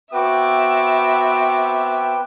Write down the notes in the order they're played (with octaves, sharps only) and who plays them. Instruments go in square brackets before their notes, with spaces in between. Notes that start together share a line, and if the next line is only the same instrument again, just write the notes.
[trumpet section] B3 C4 D6 [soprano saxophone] F#4 [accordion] B4 G5 [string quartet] E5